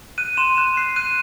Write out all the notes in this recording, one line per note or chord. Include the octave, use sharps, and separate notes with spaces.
F#6 D#7
C6 E7
F#6 E7
F#6 C7
F#6 D#7